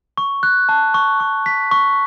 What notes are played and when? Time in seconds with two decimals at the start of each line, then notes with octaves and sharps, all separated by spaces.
0.18 C#6
0.43 F#6
0.69 A5
0.94 C#6
1.20 C#6
1.46 B6
1.71 C#6